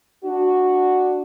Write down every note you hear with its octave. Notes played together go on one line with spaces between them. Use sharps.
D4 F#4